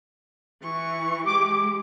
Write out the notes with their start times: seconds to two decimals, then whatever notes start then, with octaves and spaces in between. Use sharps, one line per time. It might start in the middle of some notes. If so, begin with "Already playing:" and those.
0.63 E3 C#6
1.25 G#3 G4 D6